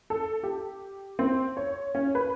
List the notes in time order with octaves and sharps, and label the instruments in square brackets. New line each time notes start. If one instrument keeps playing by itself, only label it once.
[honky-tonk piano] A4
G4
C4
C#5
C#4
B4